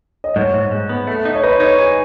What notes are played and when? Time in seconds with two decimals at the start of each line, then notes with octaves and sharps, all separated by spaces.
0.24 D#5
0.36 G#2 C#5
0.54 G#2
0.71 G#2
0.89 B3
1.07 A3
1.25 D#4
1.34 C#5
1.43 D#4 B4
1.60 D#4 C#5
1.79 G#4